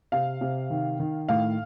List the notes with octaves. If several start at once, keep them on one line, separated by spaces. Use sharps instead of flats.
C3 F5
C3
D#3
D#3
A2 F5